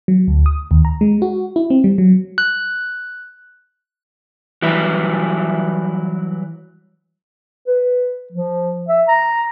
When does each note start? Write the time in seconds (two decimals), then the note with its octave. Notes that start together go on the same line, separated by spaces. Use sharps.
0.08 F#3
0.28 D2
0.46 D#6
0.71 D#2
0.85 A#5
1.01 G#3
1.22 F#4
1.56 E4
1.70 C4
1.84 G3
1.98 F#3
2.38 F#6
4.62 E3 F#3 G3 E4
7.67 B4
8.32 F3
8.89 E5
9.08 A#5